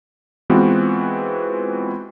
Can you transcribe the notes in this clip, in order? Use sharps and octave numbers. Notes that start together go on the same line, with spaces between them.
E3 G#3 B3 C4 F4 F#4